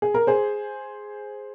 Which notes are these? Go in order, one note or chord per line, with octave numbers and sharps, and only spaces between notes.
G#4
A#4
G#4 C5